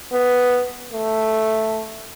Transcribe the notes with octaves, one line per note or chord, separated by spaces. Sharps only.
B3
A3